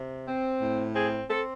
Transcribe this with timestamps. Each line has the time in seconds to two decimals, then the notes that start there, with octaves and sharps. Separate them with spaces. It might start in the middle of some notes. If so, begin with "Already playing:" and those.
Already playing: C3
0.26 C4
0.61 A2
0.94 C4 G#4
1.29 C4 A4